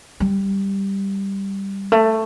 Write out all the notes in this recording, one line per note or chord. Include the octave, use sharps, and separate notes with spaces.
G3
A3